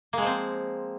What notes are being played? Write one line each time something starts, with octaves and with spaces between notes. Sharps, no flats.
F3 G#3 A#3 C4